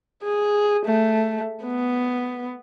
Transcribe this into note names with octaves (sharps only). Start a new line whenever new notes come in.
G#4
A3
B3